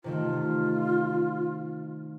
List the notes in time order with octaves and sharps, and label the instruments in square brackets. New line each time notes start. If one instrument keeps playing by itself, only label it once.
[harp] C3 D#3 A3 [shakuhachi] F4